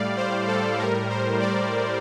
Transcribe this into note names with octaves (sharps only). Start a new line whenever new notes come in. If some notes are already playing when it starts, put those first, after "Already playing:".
Already playing: A2 G3 D5 F5
C5
A4
A2 G3 A#4
C5
D5